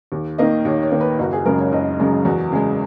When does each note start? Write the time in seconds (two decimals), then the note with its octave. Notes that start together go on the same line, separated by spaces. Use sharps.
0.12 D#2
0.38 D#3 A#3 D#5
0.65 D#2 C#5
0.83 C#5
0.92 D#3 A#3
1.01 B4
1.19 F#1 F#4
1.33 G#4
1.46 F#2 C#3 G#3 A#4
1.59 C#5
1.72 F#1 D#5
1.99 F#2 C#3 G#3
2.25 E2 F#4
2.52 C#3 G#3 G#4